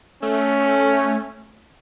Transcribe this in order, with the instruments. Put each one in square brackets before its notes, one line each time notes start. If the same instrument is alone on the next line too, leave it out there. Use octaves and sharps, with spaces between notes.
[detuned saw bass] A3 [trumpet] C#4